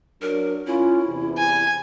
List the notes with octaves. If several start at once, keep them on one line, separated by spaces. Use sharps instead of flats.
F#3 D4 A#4
C#4 E4 F4
E2 C3
G#5